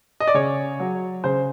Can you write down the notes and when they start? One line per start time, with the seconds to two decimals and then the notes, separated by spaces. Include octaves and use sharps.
0.20 D#5
0.27 D5
0.34 C#3 C#5
0.80 F#3
1.24 C#3 C5